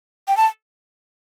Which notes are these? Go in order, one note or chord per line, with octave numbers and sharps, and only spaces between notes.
G5
A5